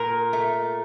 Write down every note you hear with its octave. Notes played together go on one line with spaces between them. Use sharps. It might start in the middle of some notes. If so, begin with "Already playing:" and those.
Already playing: A#2 A#4
A3